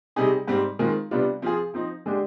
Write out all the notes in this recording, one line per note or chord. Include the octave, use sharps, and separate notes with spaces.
C3 G3 C4 D#4 G#4
G#2 G3 C4
D#3 G#3 C4 F4
C3 G3 B3 D4 F4
F3 C4 F4 G#4
F3 C4 D#4
D3 G#3 D4 G4